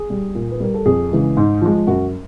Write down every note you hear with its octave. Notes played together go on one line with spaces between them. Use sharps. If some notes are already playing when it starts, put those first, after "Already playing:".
Already playing: G#4
G3
A#2
B4
G3 A#4
A4
F2 G#4
C#3 E3 G#3
G#2
F3 G#3
F#2 F#4